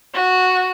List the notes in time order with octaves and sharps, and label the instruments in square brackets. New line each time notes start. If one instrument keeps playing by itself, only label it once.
[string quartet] F#4